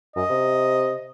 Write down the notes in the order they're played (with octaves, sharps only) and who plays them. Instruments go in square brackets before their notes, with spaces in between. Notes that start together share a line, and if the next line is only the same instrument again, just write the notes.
[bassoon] F#2 [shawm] D#5
[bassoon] C3